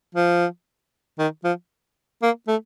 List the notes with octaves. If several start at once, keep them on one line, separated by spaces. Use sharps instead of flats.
F3
D#3
F3
A#3
A3